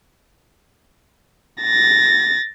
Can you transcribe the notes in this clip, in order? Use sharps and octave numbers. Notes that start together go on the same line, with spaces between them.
A6 A#6